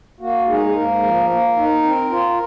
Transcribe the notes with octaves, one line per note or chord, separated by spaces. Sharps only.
A#3 F#4
G#3 D#4 G#4
G#4
G#2 A#3 A#4
F3
A#3
D#4
C4
F4